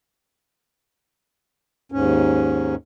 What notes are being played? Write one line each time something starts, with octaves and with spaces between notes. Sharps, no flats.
D#2 G#2 C#4